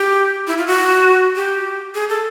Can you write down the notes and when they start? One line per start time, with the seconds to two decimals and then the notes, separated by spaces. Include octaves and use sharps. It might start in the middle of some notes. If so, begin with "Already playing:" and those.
Already playing: G4
0.47 E4
0.58 F4
0.67 F#4
1.36 G4
1.95 G#4
2.09 A4